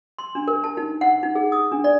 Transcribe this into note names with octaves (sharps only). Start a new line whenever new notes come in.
C6
D4
A#4
A5
D#4
F#5
D#4
G#4
D#6
D4
D5